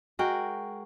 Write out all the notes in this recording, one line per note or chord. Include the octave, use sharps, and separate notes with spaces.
G#3 F#4 A#4 G5